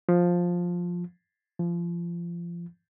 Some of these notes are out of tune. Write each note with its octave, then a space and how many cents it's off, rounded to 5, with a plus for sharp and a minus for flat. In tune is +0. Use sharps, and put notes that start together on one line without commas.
F3 +10
F3 -25